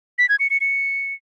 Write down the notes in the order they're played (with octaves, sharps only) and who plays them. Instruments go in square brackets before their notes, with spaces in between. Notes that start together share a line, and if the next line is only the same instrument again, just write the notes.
[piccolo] B6
G#6
C#7
C#7
C#7